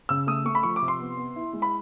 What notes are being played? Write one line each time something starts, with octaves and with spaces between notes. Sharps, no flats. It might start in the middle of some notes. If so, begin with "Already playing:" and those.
C#3 E6
A3 D#6
A3 C#6
B5
F3 C#6
D6
C3
C6
B3
B3
E4
G#3
B5